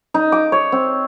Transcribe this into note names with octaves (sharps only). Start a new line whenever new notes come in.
D#4
D6
C#5
C4